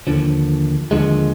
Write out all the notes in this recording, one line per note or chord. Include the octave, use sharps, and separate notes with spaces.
D#2 D3 F3
D#2 D3 F3 G#3